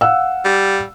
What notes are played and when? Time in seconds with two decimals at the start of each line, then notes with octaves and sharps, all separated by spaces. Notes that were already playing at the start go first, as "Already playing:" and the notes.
0.01 F5 F#5 E6
0.45 G3